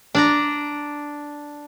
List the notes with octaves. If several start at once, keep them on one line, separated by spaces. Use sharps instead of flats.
D4 D5 A#5